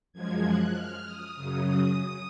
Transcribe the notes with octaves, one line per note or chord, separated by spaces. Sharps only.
F#2 F3 G#3 G#6
F#6
F6
D#6
F#2 C#3 F#3 D#6
D#6